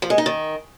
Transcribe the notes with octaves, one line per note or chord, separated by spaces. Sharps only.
F3
G#3
D#4
D#3